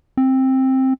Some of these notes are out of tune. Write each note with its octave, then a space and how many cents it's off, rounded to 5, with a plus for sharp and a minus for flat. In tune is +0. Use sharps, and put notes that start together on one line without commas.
C4 +10